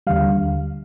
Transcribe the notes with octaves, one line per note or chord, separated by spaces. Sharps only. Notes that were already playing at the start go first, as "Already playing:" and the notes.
D#2 D3 G3 F5